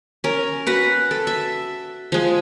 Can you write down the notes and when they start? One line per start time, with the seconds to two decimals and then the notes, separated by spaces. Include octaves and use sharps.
0.24 C#4 A#4
0.67 F#4 B4 F#5
1.11 A4
1.27 E5
2.12 F3 G#3